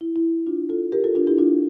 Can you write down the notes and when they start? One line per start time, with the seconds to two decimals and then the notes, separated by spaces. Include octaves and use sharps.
0.01 E4
0.16 E4
0.46 D4 F4
0.69 F4 A4
0.92 G4 A#4
1.04 F4 A4
1.15 D4 F4
1.27 E4 G4
1.38 D4 F4